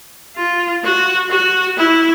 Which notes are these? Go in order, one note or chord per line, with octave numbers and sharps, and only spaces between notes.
F4
F#4
F#4
E4